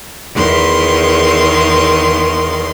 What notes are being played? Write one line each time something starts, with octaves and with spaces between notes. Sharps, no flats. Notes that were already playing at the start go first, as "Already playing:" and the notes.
E2 D#3 C6